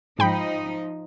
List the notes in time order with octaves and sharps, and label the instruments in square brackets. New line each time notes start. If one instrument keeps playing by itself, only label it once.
[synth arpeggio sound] G#2 G5 B5 [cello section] F3 D#4